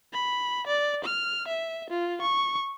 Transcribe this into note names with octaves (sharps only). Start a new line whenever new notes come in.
B5
D5
F6
E5
F4
C#6